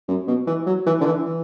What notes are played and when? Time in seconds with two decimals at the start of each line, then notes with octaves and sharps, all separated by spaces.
0.08 F#2
0.27 B2
0.47 E3
0.66 F#3
0.86 E3
1.01 D3
1.06 E3
1.25 E3